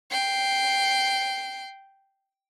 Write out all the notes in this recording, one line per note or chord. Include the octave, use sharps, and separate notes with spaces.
G5 C7